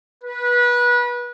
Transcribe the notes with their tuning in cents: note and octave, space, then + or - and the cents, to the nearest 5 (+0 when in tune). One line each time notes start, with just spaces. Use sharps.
B4 -25